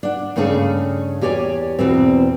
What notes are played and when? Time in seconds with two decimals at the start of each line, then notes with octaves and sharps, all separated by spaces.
0.03 D4 F#5
0.36 G2 C#3 A3 C#4 G#4 A4
1.21 E2 G4 C#5 D5 G#5
1.79 E2 B2 C4